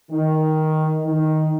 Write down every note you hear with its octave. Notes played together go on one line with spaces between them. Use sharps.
D#3
D#3